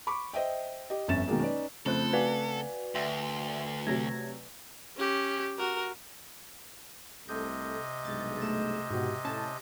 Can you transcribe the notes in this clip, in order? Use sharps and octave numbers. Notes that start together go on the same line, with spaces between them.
B5 C#6 D6
C5 D#5 E5 G5
G4 D#5
G1 F2 C#4 E5 A6 E7
B2 D#3 F#3 G#3 A#3
C#4 D#4 B4 D5
F2 C#3 A3 C4 A4 C5 F#6
F#4 B4 D5 G#5
D2 E5 G5 C6
C3 F#3 A3 G#6 A#6
C#4 G4
F#4 A#4
C2 C3 A3 A4 D#5 G6
B1 G2 G#3 A6
A3 E7
G#2 B2 F#4 G4
A2 C#4 A5